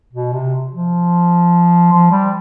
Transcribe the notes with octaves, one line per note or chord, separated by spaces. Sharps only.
B2
C3
F3
F3
G3